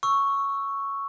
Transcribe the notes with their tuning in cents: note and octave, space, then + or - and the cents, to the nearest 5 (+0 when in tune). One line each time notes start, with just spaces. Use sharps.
C#6 +0 E6 +0